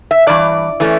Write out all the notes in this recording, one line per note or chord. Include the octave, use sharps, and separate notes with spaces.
E5
G2 E3 D5
E3 A3 C#4